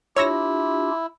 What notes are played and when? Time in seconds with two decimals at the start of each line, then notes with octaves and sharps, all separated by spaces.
0.16 D4 E4 F4 G4 C#5 E6 A#6